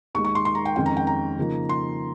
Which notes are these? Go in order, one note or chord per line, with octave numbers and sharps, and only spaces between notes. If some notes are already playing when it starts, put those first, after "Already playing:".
D#2 D#3 G#3 C#6
C#6
C6
C6
A#5
G5
F2 D#3 G#3 C#4 G5
A#5
G5
A#5
C#3 F3 A#3 D#4
C6